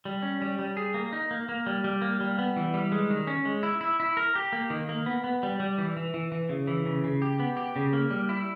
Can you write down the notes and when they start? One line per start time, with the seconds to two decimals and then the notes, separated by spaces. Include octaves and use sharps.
0.05 G3
0.23 C#4
0.42 G3
0.59 G3
0.77 G#4
0.94 A#3
1.12 D#4
1.31 A#3
1.49 A#3
1.67 G3
1.84 G3
2.02 A#3
2.21 G3
2.39 B3
2.56 E3
2.74 G3
2.92 G#3
3.10 D#3
3.27 C#4
3.45 G#3
3.63 E4
3.81 E4
4.00 E4
4.17 A#4
4.35 G4
4.53 A#3
4.70 D#3
4.89 A#3
5.06 B3
5.24 B3
5.43 G3
5.60 G3
5.78 E3
5.97 E3
6.14 E3
6.32 E3
6.49 C#3
6.67 E3
6.86 C#3
7.04 C#3
7.22 G4
7.39 B3
7.57 G4
7.76 C#3
7.93 A#3
8.10 G3
8.29 E4